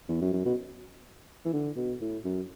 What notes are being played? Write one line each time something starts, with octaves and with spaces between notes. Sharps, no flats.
E2
F#2
F#2
B2
E3
D3
B2
A2
F#2